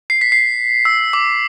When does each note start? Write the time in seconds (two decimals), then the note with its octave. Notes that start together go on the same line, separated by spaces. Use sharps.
0.10 C7
0.21 B6
0.32 C7
0.85 E6
1.13 D6